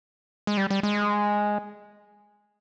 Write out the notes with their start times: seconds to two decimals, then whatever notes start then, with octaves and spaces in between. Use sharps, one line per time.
0.47 G#3
0.57 G3
0.70 G3
0.83 G#3